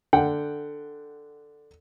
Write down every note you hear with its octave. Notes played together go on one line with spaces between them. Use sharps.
D3 F#5 G5